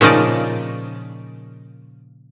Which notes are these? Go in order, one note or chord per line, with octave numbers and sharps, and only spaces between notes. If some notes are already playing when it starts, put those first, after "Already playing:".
A#2 C#3 F3 D#4 D5